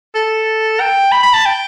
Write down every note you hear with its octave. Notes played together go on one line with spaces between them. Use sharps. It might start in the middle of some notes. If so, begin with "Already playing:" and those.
A4
G5
B5
B5
A5
G5